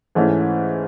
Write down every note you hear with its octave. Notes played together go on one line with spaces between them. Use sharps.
G#2 E3 A3 C#4 E4